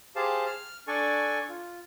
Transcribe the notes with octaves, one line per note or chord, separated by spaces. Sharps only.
G4 G#4 C5 F5 A5
F6
D4 A4 D5 G#5 C#6
F4